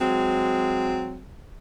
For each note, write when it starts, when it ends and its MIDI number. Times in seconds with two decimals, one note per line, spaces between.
0.01 1.22 54
0.01 1.22 56
0.01 1.22 60